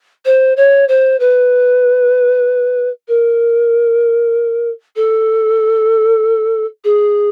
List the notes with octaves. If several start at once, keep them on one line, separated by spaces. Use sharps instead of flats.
C5
C#5
C5
B4
A#4
A4
G#4